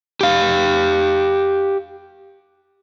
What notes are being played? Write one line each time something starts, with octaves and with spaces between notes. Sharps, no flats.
G4 F5